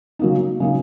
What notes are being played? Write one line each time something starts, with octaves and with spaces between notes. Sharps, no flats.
C#3 F#3 A#3 D#4
C#3 F#3 A#3 D#4